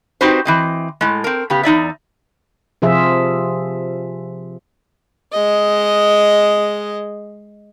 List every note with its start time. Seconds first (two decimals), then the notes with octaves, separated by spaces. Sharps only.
0.21 C4 D#4 F#4 G4 B4 C5
0.45 E3 C4 D#5
1.01 A2 G#3
1.24 C4 A#4
1.50 C#3 B3 G4
1.63 E2 D#4 D5 E5
2.82 C3 F3 F4 G#4 E5
5.32 G#3 D#5